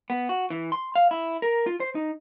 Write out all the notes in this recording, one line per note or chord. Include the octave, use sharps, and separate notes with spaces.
B3
F#4
E3
C6
F5
E4
A#4
F4
C5
D#4